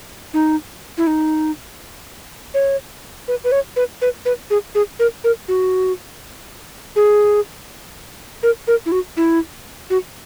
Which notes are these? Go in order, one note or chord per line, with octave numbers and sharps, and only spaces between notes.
D#4
E4
D#4
C#5
B4
B4
C#5
B4
B4
B4
G#4
G#4
A#4
A#4
F#4
G#4
A#4
A#4
E4
F#4
E4
F#4